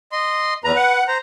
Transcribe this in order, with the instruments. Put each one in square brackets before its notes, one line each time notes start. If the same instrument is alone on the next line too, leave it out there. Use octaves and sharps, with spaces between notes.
[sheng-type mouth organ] D#5 C6
[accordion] E2 A#5 [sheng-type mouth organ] B4
[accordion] F#5
[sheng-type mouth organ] C5 A#5